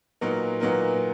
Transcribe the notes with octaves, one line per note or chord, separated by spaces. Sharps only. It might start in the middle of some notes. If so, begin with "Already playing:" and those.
A#2 F#3 B3 D#4 A#4
A#2 F#3 B3 D#4 A#4